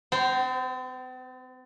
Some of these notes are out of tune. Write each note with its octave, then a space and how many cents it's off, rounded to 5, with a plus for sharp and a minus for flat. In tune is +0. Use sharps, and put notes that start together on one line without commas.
C4 -45 C5 +0 A#5 +0